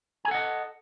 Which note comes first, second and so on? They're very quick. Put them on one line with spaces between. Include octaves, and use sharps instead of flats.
G#5 A4 F#5 D#5